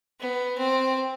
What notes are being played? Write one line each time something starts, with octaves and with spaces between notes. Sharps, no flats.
B3
C4